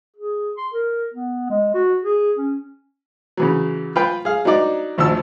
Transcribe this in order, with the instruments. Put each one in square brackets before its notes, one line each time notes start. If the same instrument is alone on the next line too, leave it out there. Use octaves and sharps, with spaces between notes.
[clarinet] G#4
C6
A#4
B3
G#3
F#4
G#4
C#4
[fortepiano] C#3 E3 F#3
F4 B4 G5
G#4 F5
F#3 D4 D#4 D5
G#1 D2 F3 A5 E6